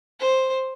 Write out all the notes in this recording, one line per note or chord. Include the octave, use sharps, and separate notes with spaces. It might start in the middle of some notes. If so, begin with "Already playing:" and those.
C5